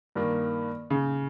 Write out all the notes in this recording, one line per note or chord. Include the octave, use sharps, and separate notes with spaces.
G2 D#3 A#3
C#3